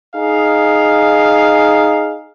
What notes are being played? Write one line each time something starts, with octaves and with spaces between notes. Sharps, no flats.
D#4 G#4 F5